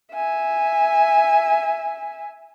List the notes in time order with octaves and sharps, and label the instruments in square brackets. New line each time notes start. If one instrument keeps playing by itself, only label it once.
[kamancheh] E5 G#5